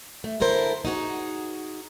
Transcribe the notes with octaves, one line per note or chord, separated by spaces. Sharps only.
A3
D3 E4 A4 A#4 C5
D#4 F#4 G#4